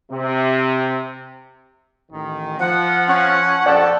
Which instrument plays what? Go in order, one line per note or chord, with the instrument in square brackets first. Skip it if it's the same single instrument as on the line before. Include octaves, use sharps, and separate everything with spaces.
[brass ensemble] C3
[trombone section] A1 D#3
[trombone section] F3 [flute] F#5
[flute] C#4 [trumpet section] F#5
[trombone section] A#1 F2 F3 [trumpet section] A4 G5 A5 [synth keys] D5 F#5